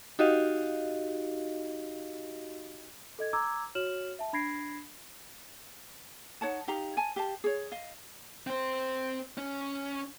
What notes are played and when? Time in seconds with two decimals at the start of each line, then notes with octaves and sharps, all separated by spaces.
0.19 D#4 F#4 G4 D#5 F5
3.19 A4 D#5 G#6
3.33 A#5 D6 E6 G#6
3.75 F#4 C#5 F6 E7 F#7
4.19 E5 A5
4.33 D4 B5 G#6 A#6 C7 D7
6.41 D#4 C#5 F#5 A5
6.68 D#4 G4 F5 A#5
6.97 G#5 A5
7.16 G4 F5 A5
7.44 G#4 C#5
7.72 D#5 F5
8.47 C4 C5
9.38 C#4